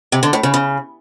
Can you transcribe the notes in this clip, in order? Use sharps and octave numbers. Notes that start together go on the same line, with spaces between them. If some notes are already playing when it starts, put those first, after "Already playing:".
C3
D3
A2
C#3
C#3